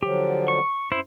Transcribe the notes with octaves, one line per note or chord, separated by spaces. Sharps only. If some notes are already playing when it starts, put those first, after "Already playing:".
D3 F3 F#3 G4
C#6
F#2 E4 C5